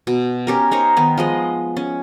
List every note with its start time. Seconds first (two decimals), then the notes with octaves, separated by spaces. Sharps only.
0.07 B2
0.47 C#4 G4 A#4
0.71 D#4 A#4 C5 C#5
0.97 D#3 B3
1.18 F3 G#3 D#5
1.77 C#4